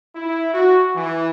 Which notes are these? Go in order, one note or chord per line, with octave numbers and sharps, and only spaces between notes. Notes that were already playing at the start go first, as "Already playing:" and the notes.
E4
F#4
E3